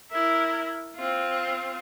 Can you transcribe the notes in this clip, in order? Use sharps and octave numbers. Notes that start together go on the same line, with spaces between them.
E4 A#4
C4 F4